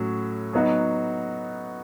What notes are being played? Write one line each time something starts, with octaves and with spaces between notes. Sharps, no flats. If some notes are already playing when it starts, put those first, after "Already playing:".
Already playing: A2 F#3 C#4 F#4
F#3 B3 D#4 F#4